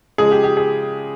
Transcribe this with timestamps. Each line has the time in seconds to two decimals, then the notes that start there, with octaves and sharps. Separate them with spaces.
0.18 C#3 F3 G#3 G#4
0.31 G4
0.44 G4
0.57 G#4